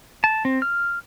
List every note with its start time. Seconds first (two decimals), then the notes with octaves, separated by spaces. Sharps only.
0.24 A5
0.45 C4
0.62 F6